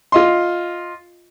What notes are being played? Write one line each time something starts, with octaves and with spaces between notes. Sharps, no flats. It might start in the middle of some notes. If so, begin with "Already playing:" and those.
F4 D#5 C6